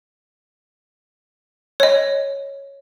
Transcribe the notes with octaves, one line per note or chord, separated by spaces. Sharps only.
C#5 D#5